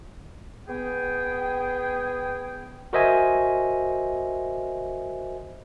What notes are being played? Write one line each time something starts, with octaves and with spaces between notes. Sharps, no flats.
B3 G#4 G5
F#4 A#4 C5 D#5 E5 G#5